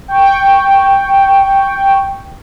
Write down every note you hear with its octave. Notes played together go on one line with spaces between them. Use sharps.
G5 C#6